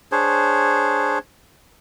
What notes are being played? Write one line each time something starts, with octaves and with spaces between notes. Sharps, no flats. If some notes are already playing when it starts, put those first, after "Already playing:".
D4 G#4 C5 C#5